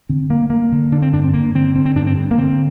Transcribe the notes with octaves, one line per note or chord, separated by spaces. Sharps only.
D3 C4
G2 A#3
G2 A#3
D3
D3 D4
C4
G2 D4
C4
G2 A#3
D3 C4
D3 C4
C4
G2 D4
C4
G2
A#3
D3 C4